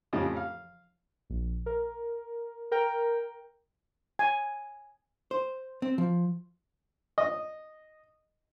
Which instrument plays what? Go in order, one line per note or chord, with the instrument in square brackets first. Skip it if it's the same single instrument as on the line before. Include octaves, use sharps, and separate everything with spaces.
[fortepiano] F2 A2 C#3 G4 D#5
F5
[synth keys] A#1
A#4
A#4 G5 A#5
[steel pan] G#5
[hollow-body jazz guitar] C5
C4
F3
[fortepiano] D#5